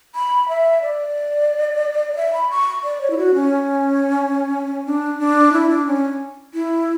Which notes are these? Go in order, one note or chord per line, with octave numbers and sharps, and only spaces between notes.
B5
E5
D5
E5
B5
C#6
D5
C#5
E4
F#4
C#4
D4
D4
E4
D4
C#4
E4